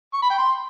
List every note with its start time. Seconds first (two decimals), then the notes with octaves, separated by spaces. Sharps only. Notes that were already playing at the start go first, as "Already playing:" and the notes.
0.14 C#6
0.22 B5
0.30 G5
0.39 C6